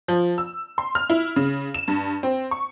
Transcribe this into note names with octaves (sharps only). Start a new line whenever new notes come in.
F3
E6
C6
F6
E4
C#3
E7
G2
C4
C#6